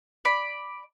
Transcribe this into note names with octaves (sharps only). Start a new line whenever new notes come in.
D5 B5